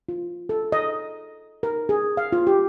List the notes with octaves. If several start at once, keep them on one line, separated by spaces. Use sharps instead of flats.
F4
A4
D#5
A#4
G#4
F5
F4
G4